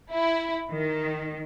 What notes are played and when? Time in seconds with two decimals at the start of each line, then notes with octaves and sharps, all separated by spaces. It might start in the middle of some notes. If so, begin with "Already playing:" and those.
0.11 E4
0.72 D#3